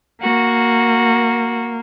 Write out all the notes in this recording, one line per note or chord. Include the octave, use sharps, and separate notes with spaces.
A#3 F#4